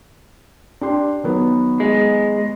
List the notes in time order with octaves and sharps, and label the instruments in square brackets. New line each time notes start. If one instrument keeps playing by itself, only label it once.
[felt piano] D4 G4 C6
D#3 F#3 B3
[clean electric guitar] G#3